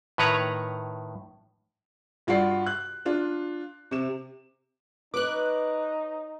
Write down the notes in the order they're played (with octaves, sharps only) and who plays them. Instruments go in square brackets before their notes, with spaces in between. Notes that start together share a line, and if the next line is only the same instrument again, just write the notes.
[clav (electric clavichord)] A2 D#3 B4 C#5 A#5
[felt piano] G2 F4 F#4 D5 C7
F#6
D4 F4
C3 E7
[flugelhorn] D#4 [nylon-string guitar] B4 C#5 [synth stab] D6 F#6